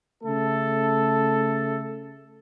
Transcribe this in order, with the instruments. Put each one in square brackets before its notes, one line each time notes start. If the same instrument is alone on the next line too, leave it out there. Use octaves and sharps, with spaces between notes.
[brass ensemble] C#3 A3 A4